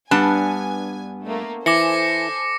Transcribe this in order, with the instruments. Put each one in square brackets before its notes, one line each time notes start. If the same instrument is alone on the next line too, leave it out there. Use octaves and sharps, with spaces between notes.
[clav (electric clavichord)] G2 [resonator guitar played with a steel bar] B3 D4 A5 [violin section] G#5
[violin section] A3 A#3
[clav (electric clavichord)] E3 [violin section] A4 C5 G#5 [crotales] D6 A#6 C#7